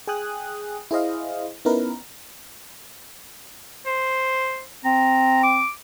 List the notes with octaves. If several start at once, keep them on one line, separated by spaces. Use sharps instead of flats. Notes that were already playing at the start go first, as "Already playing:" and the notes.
G#4 G5 G#5 D#6 F#6
E4 G#4 C5 D#5 F5
B3 C#4 D#4 E4 A#4 B4
C5
C4 A#5
D6